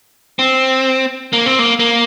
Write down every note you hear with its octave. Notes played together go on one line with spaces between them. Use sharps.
C4
A#3
C4
A#3
A#3